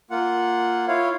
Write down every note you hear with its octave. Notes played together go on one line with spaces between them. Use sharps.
A#3 F4 F#5
E4 F4 C#5 F5